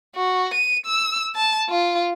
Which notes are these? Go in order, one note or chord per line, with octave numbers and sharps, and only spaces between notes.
F#4
D#7
E6
A5
F4